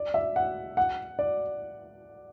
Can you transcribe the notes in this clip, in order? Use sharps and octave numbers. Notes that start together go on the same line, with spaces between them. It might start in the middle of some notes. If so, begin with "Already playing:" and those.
Already playing: D5
E5
F#5
F#5
D5